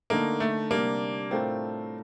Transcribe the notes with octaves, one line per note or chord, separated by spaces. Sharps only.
D3 A3 A#3 D#4 A#4
A3
C3 G3 A#3 D4 G4 A#4
A2 A3 C4 D4 F4 A#4